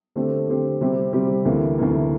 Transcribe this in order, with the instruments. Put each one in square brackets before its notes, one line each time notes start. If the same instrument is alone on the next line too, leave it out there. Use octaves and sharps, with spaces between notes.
[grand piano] D3 A3 C4 G4
D3 A3 C4 G4
C3 G3 C4 G4
C3 G3 C4 G4
D2 C3 E3 A#3
D2 C3 E3 A#3